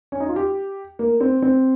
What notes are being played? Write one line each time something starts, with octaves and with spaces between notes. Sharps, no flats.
C#4
D#4
F4
G4
A#3
C4
C4